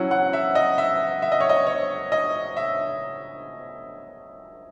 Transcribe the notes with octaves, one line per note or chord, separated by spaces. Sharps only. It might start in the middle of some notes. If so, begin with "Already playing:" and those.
Already playing: F#3 C#4 E4 F#5
F#5
E5
D#5
E5
E5
D#5
C#5
D#5
C#5
D#5
E5